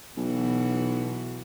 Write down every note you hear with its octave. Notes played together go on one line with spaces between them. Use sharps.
B1 B2 E3 F#4